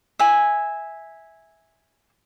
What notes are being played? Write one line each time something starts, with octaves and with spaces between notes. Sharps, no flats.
E5 G#5